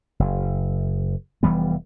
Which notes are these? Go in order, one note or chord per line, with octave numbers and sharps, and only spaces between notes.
F#1
F1 E3 G3 B3